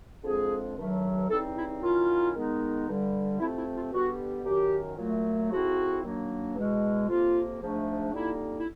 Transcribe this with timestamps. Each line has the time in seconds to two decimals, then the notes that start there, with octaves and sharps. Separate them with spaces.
0.23 F2 D3 F3 G#3 C4 G#4
0.77 G2 D#3 F#3 A3
1.28 C#3 E3 G3 C4 D#4 A4
1.55 E4
1.81 D#3 F#3 A#3 C#4 E4 F4
2.34 D#3 G#3 B3 D#4
2.87 G2 D3 G3
3.39 C3 F3 A3 C4 E4
3.57 E4
3.74 F4
3.92 D3 G3 B3 F#4
4.45 F#2 D#3 F#3 G4
4.97 A#2 F#3 A3
5.50 G#2 F3 A3 C4 E4 F#4
6.03 D#3 F#3 A#3 D4
6.56 E2 B2 G#3
7.08 F2 C3 F3 A#3 F4
7.61 G#2 F3 A3 D4
8.13 F2 D3 G3 A#3 D#4 E4
8.57 E4